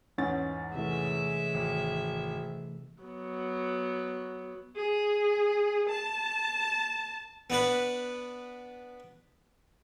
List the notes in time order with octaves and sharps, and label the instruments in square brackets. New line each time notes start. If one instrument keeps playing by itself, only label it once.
[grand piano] E2 G#2 A6 [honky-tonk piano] C#4
[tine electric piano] C3 E3 A3 [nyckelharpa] G#3 E5
[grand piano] G#1
[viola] F#3 B3
G#4
A5
[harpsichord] B3 D4 B4